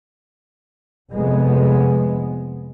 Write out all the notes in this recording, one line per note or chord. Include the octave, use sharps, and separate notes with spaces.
F1 F2 G#3 B3